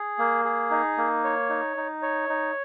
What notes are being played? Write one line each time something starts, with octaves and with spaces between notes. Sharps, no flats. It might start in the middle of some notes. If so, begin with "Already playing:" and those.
Already playing: G#4
A#3
G#4
D#4
A#3
C#5
D#4
D#4
C#5
D#4